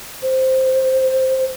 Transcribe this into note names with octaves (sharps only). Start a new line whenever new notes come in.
C5